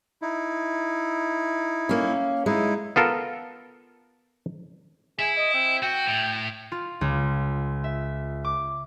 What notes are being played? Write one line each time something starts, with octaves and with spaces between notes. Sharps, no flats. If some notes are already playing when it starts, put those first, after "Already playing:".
D#4 E4
A#3 C#4
G#3 D#4 E4
B3 F4 A4 A#4
E4 G#4
D#5
C4
F#4 G5
A2
F4
C#2
E5
D6